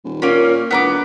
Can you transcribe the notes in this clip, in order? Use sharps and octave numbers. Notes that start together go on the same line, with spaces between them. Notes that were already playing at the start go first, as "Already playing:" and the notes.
D#1
A#2 A#3 C#4
E1 B3 A#5 D6